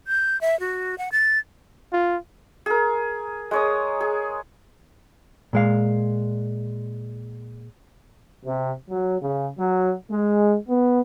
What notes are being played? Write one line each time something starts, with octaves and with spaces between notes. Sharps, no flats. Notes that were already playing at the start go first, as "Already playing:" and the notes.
G6
E5
F#4
F#5
A6
F4
G#4 A#4
G#3 C#5 D#6
G#4
A#2 G#3 F5
C3
F#3
C#3
F#3
G#3
B3